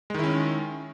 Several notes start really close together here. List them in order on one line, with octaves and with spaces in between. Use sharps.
G#3 D#3 E4 C#4